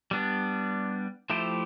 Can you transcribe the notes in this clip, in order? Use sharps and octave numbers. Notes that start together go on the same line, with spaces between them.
G3 B3 D4
F3 A3 E4 G4 C5